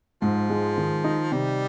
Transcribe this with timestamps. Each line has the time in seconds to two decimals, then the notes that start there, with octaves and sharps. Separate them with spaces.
0.22 G#2 F3
0.50 G#3
0.78 D#3
1.04 D#4
1.32 C3 G3